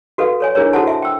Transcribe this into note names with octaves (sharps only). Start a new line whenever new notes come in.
F#4 A4 B4 F5
A4 C#5 G#5
D4 E4 G#4 A#4 C#5
E4 F#4 A4 C5 F#5 A5
E5 A5
G5 E6